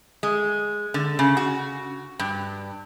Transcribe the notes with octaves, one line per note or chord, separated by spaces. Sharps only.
G#3
D3
C#3
F#4
G2